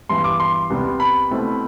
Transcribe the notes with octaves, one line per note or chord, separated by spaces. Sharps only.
G2 E3 G3 B3 C6
D6
C6
C2 C3 G3 B3
B5
B2 A3 C4 E4